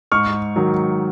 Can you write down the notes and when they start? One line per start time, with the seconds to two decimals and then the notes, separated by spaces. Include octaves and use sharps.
0.12 G#2 C#6 F6
0.56 D#3 F#3